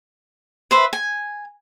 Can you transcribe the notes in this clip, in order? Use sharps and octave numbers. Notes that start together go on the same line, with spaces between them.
B4 C5 E5
G#5